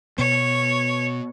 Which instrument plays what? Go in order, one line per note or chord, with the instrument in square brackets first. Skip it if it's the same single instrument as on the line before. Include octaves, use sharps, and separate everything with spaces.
[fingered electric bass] B2 B3 [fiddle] C#5